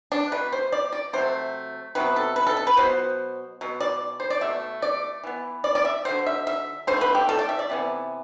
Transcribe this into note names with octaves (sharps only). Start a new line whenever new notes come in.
D4
B2 A3 B4
C5
D5
D5
C3 F#3 A3 C5
C3 F#3 B3 B4
A4
B4
A4
A4
B4
B2 F#3 B3 C5
B2 F#3
D5
C5
D5
B2 A3 E5
D5
E3 B3
D5
D5
E5
D3 F#3 B3 C5
E5
E5
D3 A3 C5
B4
G4
A4
D5
E5
D5
C3 E3 B3